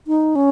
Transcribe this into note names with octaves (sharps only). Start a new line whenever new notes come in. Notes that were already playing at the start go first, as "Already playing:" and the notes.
D#4
C#4